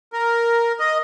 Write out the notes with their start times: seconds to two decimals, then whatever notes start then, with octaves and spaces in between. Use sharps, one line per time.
0.13 A#4
0.79 D#5